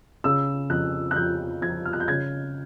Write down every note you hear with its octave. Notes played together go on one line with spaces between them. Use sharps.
C#3 E6
F2 F#6
F#6
F2 G6
F3 G#6
F6
F#6
G6
C#3 G#6